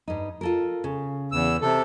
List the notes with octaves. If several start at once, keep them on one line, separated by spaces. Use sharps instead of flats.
G2 D#4
F4 A4 A#4
C#3
E2 E6
C3 A4